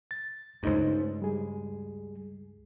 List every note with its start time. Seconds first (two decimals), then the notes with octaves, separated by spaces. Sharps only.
0.11 A6
0.63 C#2 G2 A3 D#4 C5
1.22 G3 G#4